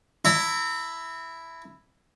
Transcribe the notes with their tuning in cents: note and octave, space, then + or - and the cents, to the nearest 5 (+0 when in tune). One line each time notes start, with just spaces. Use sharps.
E4 +0 A#5 -35